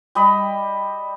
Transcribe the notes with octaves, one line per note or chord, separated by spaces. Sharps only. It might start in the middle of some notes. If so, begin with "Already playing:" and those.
G3 D#5 B5